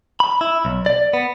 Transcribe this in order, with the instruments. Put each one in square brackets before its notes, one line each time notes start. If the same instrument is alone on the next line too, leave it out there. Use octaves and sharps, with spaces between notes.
[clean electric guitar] B5
E4
B1
D5
B3